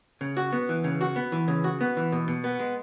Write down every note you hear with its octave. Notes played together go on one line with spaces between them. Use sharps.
C#3
F#4
B3
E3
C#3
F#4
B3
E3
C#3
F#4
B3
E3
B2
B2
B3
G#3